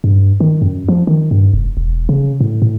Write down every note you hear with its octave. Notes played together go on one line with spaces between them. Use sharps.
G2
D#3
F#2
F3
D#3
G2
F1
E1
C#3
A2
A2